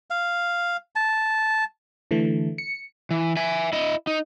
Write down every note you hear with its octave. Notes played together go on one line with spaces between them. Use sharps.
F5
A5
D3 E3 A3
C#7
E3
E5 G#5
E4 D#5
D#4